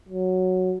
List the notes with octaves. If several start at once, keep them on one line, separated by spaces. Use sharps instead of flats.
F#3